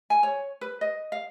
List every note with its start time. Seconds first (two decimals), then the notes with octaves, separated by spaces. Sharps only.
0.10 G#5
0.23 C#5
0.61 B4
0.81 D#5
1.12 F5